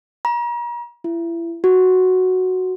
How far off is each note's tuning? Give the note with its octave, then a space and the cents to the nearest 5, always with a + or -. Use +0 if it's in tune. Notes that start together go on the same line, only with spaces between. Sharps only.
A#5 +40
E4 +30
F#4 +0